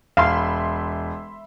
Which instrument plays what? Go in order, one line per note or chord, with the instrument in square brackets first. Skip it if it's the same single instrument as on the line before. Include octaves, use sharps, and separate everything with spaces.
[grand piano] E1 [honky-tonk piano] E5 B5 C6 [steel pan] F5